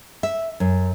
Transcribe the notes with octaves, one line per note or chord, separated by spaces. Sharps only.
E5
F#2